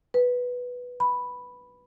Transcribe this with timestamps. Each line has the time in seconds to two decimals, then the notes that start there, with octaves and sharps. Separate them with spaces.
0.14 B4
1.00 B5